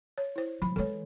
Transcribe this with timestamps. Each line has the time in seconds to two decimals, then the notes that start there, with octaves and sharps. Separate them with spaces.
0.18 C#5
0.36 E4 C5
0.62 F3 B5
0.76 E3 G#3 A4 C#5